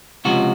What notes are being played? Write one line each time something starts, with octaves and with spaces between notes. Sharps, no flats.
C#2 C3 F3 F#4